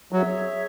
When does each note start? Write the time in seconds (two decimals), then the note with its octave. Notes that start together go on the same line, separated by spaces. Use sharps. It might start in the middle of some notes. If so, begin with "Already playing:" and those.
0.12 F#3 G#4 C#5 E5